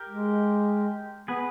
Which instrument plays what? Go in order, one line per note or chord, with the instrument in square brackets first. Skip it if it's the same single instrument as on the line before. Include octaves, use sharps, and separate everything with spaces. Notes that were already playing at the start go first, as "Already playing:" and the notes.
Already playing: [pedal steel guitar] G4 A#4
[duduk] G#3
[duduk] B3 [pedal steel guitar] G#4 B4